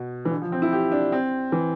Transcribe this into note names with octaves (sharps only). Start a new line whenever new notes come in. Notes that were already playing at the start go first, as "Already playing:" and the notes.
Already playing: B2
E3
D3
F3
C4
E4
G4
D4
C4
E3